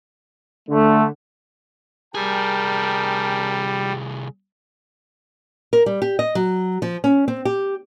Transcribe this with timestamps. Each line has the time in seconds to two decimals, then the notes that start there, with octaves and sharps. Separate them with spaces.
0.69 D3 A3
2.15 C2 G3 G#4 A#4 G5 A5
5.73 A#4
5.86 G3
6.02 G4
6.19 D#5
6.35 F#3
6.82 F3
7.04 C#4
7.28 C4
7.45 G4